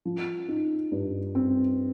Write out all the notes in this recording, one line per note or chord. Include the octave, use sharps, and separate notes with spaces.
F3
D#4
G2
C4